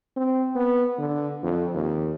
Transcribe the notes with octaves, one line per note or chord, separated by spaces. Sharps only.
C4
B3
D3
F2
D#2